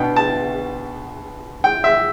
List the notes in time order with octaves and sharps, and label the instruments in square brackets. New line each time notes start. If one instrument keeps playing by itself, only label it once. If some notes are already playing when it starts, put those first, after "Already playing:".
Already playing: [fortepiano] B2 B3 D4 G5
A5
G5
E5